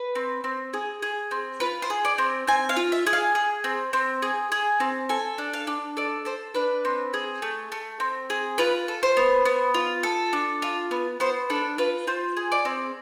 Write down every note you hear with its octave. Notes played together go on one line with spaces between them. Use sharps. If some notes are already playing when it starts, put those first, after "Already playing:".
Already playing: B4
C4
C4
G#4
G#4
C4
F4 B4
C5
G#4
D5
C4
C4 G#5
F5
F4
E5
G#4
F5
G#4
C4
C4
G#4
G#4
C4
A4 G#5
D4
F5
D4
A4 D5
A4 C5
D4 B4
C4
G#4
A3
A3
C4
G#4
F4 B4
A4
C5
B3
B3
F4
A4
D4
F4
B3
B3 C5
D4 A4
F4 B4
F4 C5
G#4
D5
C4